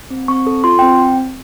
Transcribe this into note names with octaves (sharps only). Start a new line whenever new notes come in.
C4
C4 C#6
A4
F4 C6
C4 G5